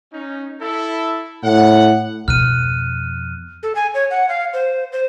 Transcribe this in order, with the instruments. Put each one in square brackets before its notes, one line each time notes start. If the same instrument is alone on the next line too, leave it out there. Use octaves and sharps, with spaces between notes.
[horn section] C#4 D#4
E4 A4
[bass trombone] A2 [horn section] F#5
[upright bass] F2 B2 [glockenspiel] F6 F#6 D#7
[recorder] A4
G#5
C#5
F#5
F5
C5
C5